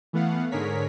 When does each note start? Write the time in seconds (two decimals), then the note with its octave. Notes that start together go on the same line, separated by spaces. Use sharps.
0.13 E3 A3 B3 F5 F#5
0.51 G#2 D3 G#4 A#4 C#5 B6